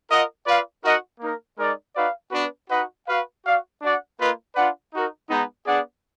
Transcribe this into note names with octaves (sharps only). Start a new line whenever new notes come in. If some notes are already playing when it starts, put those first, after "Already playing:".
F4 A#4 D#5 F#5
F4 B4 D5 F5
D#4 F#4 A#4 D#5 F#5
A#3 D#4 A#4
G#3 D#4 A#4 D5
D#4 F#4 B4 D5 F5
B3 D4 F#4 B4
D#4 F#4 B4 D#5 F#5
F#4 B4 F5
F#4 D5 F5
D4 F#4 D5 F#5
A#3 F4 B4 D#5
D4 F4 B4 D5 F#5
D#4 F#4 A#4
G#3 B3 D#4
B3 D4 G#4 D5 F#5